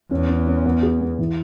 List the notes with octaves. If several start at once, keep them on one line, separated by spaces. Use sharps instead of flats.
E2 C#4
C#4
C#4
B3
G#4
B3
E3